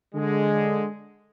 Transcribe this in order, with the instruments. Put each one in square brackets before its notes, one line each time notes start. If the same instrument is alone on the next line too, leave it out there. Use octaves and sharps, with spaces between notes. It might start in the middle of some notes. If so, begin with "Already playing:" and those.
[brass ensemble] D3 G#3